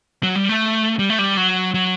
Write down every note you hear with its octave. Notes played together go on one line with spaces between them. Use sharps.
F#3
G3
A3
G3
A3
G3
F#3
F#3